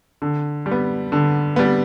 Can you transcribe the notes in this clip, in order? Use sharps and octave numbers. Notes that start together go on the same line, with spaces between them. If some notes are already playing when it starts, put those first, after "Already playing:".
D3
G3
B3
D3
G3 B3